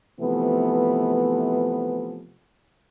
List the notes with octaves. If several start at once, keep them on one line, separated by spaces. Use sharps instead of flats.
C3 E3 F3 A3 B3